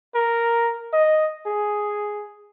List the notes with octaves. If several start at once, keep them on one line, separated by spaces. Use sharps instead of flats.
A#4
D#5
G#4